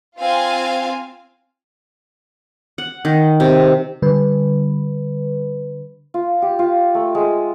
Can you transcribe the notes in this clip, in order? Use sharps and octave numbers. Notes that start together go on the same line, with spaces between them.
C4 F4 F5 G#5
F#5
D#3
C3
D3 G3 B4
F4
G4
F4
A3
G#3